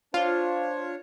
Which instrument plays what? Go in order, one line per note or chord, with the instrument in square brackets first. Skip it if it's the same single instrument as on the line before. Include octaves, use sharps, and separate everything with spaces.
[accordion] D4 C#5 [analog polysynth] F4 [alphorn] C5